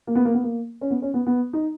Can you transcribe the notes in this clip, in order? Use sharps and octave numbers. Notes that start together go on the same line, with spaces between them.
A#3
B3
A#3
B3
A#3
C#4
B3
C#4
B3
B3
D#4